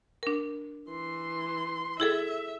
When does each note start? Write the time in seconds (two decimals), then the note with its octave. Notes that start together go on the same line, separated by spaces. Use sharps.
0.23 D4 A#4
0.90 E3 C6
2.00 E4 G#4 A4 E5